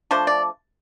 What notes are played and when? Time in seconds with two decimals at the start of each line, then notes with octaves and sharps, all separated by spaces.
0.11 F3 A3 D4 C5
0.27 D5